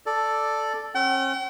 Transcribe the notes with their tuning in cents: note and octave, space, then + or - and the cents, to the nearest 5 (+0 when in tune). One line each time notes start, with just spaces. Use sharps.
A4 +0 D5 +0
C#4 -45 G5 -45